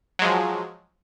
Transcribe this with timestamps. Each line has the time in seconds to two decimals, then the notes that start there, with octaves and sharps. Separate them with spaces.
0.19 F#3
0.22 G#3
0.25 F3